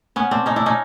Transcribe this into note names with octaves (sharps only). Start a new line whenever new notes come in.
B3 C#4
C4 D4
C#4 D#4
D4 E4
C#4 D#4